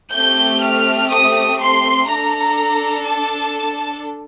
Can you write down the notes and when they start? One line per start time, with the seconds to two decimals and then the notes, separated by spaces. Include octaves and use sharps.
0.13 A3 C4 G4 G6
0.62 F6
1.10 D#6
1.60 C6
2.09 D4 A4 A#5
3.07 A5